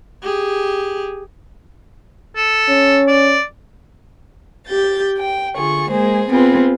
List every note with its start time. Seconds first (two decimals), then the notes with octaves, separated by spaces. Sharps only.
0.22 G4 G#4
2.37 A4
2.69 C#4
3.08 D5
4.65 G4 G6 A6
5.17 G5
5.56 D3 F4 G#4 C#6
5.90 G#3 A#3 G#4 C5
6.29 B3 C4 F4 G#4 B4